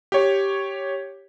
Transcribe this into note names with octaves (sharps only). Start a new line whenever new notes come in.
G4 C#5